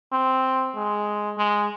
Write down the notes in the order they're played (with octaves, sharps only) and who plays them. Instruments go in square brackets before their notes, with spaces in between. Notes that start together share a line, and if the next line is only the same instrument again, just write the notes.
[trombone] C4
G#3
G#3